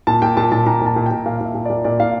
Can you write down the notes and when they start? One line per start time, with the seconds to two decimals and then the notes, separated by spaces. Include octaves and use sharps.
0.07 A#2 A5
0.22 A#2 G5
0.37 A#2 A5
0.52 A#2 A5
0.66 A#2 A#5
0.81 A#2 A5
0.96 A#2
1.06 G5
1.11 A#2
1.26 A#2 F5
1.41 A#2 E5
1.55 A#2
1.65 A#2 D5
1.85 A#2 D5
2.00 A#2 F5